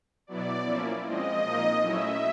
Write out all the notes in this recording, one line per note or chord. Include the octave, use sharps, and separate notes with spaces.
B2 F#3 B3 E4 D5
F3 A#3 C#4 E4
F3 G#3 C4 D#5
A#2 F3 A#3 D#4
F#3 A3 C#4 E4 E5